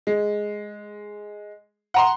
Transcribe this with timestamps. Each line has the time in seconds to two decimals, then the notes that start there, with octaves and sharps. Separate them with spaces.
0.07 G#3
1.94 F#5 A#5 C6